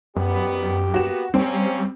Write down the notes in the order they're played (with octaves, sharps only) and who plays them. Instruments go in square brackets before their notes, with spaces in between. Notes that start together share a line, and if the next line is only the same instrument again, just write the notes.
[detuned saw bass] F#2 [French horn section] D#3 G3 B3 [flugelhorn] G4
[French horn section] A#3 B3 [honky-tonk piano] F#4 E7
[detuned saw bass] G3 [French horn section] A#3 C#4 [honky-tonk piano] C4